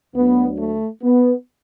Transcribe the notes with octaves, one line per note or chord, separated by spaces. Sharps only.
D2 D3 F#3 B3
A3
B3